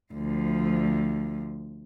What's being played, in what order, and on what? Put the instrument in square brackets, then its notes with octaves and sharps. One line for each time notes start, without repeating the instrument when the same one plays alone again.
[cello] D2 F3